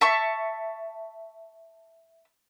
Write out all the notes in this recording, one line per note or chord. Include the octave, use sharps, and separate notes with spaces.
E5 A5 C#6